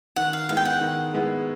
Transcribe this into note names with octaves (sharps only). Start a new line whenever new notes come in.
D#3 F#5
F5
G#3 B3 E4 G#4 F5
G5
F#5
D#3
G#3 B3 E4 G#4